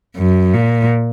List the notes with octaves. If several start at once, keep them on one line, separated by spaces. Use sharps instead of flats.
F#2
A#2